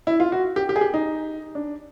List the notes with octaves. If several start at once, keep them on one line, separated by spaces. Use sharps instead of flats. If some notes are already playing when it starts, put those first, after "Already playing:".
E4
F4
F#4
G4
G4
G#4
G4
D#4
D4